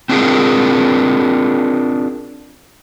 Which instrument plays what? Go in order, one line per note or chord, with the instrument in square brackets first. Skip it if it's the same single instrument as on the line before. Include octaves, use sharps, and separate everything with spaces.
[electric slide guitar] C4 D4 F4 G#4 A#4